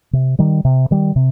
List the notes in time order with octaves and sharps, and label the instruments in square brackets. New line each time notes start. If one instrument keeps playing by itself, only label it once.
[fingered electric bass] C3
D#3 G3
C3
D#3 G3
C3